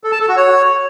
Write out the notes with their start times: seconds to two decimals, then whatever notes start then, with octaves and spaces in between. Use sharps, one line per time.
0.04 A4
0.12 A5
0.20 A4
0.29 F#4
0.37 C#5